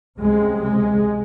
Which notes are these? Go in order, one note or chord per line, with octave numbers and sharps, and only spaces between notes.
C#2 C3 G#3
G#3